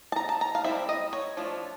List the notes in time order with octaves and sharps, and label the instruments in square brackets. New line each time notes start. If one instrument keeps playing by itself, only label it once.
[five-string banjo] A5
A#5
A5
A#5
F5
G3 C4 E4 E5
D#5
C#5
F3 A3 D4 F4